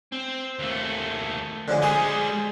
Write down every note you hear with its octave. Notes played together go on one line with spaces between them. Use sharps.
C4
D#2 A3
D3 F3 G#3
G3 G#3 G#4 C5 D#6